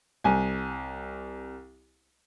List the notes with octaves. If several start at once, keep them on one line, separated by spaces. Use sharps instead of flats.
C2 G#5